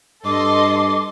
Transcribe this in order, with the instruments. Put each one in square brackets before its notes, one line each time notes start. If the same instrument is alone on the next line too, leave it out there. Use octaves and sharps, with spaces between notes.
[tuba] G2 [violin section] A4 D#5 C6 [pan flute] D6